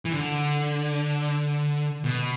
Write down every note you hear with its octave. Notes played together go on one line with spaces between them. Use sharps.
E3
D3
B2